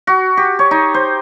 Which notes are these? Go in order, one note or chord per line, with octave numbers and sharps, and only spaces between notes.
F#4
G4
C#5
D#4
C5